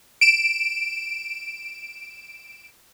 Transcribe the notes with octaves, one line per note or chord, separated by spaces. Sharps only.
D7 E7